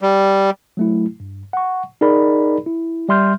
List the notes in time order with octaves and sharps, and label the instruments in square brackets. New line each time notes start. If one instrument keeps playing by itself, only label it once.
[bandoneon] G3
[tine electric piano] F#3 A3 E4
G2
F#5 C#6
D#4 G#4 A#4 D5 B5
E4
G3 E5 C6 F6 G6